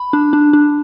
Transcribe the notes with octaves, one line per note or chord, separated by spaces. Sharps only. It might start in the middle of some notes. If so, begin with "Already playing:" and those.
Already playing: B5
D4
D4
D4